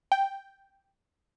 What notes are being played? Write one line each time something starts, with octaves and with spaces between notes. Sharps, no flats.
G5